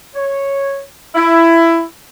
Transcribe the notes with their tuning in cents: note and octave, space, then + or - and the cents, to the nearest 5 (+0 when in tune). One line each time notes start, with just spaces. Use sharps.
C#5 -5
E4 +15